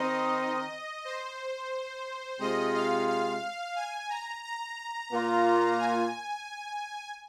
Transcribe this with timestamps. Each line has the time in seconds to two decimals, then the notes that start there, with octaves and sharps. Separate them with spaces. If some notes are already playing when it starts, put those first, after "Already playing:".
Already playing: D#3 C4 D#4 D#5
1.05 C5
2.40 C3 G#3 F4 D#5
2.75 F5
3.08 F5
3.76 G#5
4.09 A#5
4.43 A#5
5.11 A#2 A#3 F4
5.78 G#5